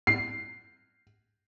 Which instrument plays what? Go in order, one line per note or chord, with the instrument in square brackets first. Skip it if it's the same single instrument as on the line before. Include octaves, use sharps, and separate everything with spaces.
[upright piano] C7